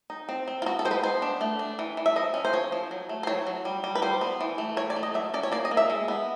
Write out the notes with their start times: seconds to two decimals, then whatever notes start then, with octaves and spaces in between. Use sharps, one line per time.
0.10 D#4
0.29 C4
0.48 C4
0.62 F4
0.66 B3 F#4
0.79 A4
0.85 G#3 C5
0.91 B4
1.03 B3 C5
1.22 D4
1.41 A3
1.59 D4
1.79 E3
1.97 E3
2.06 E5
2.16 F3 D#5
2.34 C#4
2.45 C5
2.53 F3 C#5
2.72 F3
2.91 F#3
3.09 A3
3.23 C5
3.27 F#3 C#5
3.47 F#3
3.65 G3
3.84 G3
3.95 B4
4.02 G3 C5
4.21 B3
4.41 E3
4.58 A3
4.77 E3 C#5
4.90 D5
4.96 A3
5.03 D#5
5.14 F#3 E5
5.34 C#4 D5
5.43 C#5
5.52 A#3 D5
5.65 D#5
5.71 A#3
5.77 E5
5.90 G#3
6.08 B3